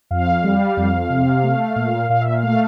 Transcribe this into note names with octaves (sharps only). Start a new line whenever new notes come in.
F2 F5
G3
F2
C3
A3
A#2
A#2 F5
E5
F5
A3